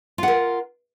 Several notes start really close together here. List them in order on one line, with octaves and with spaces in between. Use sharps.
F4 F#5 A#4